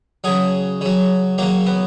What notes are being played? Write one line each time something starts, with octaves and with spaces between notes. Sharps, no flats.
C#3 F#3 G#4
C#3 F#3
C#3 F#3 A#3
B3